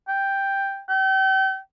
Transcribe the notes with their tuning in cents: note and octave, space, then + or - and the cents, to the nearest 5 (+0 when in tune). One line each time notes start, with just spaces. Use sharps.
G5 +5
G5 -35